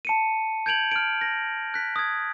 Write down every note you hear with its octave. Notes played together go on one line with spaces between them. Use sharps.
A5 C#7 D#7
G6 G#6 D7 F7 F#7
F6 D7
A#6
F#6 B6
D#6 G#6